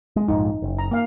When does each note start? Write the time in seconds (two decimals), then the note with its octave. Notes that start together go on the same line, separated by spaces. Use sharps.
0.16 G#3
0.28 A#1 F2 G#2 D#4
0.62 F#1
0.79 A#5
0.91 A#3 F5